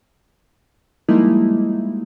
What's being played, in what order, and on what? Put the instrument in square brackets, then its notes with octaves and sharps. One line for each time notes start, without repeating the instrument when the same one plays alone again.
[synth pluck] F3 G3 G#3 A#3 D#4 E4